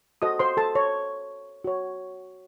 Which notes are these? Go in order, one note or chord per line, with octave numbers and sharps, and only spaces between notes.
F#4 A4 C5 D#5 D#6
C5 C6
A4 A5
C#5
F#4 C#5